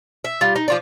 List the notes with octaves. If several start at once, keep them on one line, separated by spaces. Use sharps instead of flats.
E5
G3 F4
D#4
F3 F4 D5